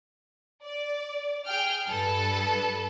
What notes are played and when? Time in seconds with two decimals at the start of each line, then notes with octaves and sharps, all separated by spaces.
0.64 D5
1.46 G#4 G5 F6
1.89 G2 A4 B4 A5